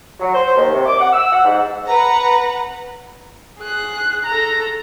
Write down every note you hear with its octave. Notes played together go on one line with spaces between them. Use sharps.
F#3
C5
D#2
C3
D6
F#5
E6
F#5
G#2
B4 F#5 A#5
G#4 F#6
A4 A#5